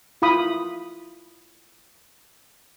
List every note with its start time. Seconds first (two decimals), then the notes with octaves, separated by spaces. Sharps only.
0.22 E4 F4 F5 B5 D#6